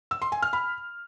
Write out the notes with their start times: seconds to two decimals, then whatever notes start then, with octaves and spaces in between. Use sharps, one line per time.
0.11 E6
0.22 C6
0.32 G#5
0.42 F6
0.53 B5